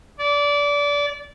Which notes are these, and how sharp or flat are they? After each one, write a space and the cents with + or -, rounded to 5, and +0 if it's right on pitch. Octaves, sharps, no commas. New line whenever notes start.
D5 -25